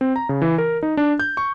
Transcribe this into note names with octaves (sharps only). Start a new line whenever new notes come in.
C4
A#5
C#3
E3
A#4
D#4
D4
G6
C#6